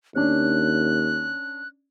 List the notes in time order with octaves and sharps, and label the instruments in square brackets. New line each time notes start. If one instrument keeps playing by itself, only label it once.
[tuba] D#2 [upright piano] C#4 D4 [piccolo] F#6